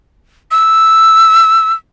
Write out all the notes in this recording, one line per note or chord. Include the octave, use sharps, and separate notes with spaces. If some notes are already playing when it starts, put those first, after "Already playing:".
E6